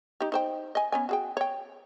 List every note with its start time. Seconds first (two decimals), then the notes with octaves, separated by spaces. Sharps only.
0.21 D#4 G4
0.32 D#4 C5 G5
0.75 D#5 G#5
0.92 B3 C#4 G#5
1.09 F#4 G#4 G5
1.37 C#5 G5